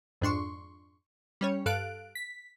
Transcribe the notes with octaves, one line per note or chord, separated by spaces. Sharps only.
F2 G#2 D4 C6 C#6
G3 C#4 C#5
G2 A4 F5 F#6 D7
B6